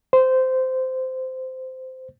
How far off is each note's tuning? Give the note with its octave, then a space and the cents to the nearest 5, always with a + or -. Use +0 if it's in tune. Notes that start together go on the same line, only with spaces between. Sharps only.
C5 -15